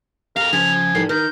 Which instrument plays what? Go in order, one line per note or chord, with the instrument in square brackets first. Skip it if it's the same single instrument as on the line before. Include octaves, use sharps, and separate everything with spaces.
[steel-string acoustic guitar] G4 [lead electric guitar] A4 F5 [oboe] A#4 [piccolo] F7
[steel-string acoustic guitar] C#3 [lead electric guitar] F3 [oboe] G#5
[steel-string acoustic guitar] A2 D#3 G3 [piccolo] C7
[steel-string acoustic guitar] D#3 [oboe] A#4 [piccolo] G6